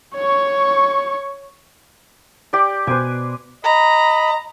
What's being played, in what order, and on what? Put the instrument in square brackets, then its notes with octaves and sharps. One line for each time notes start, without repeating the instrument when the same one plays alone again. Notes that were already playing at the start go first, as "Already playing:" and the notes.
[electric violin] C#5 C#6
[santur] G4 D5
[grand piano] B2 D6 [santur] B4 C5 G#5
[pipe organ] D#5 B5 [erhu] A#5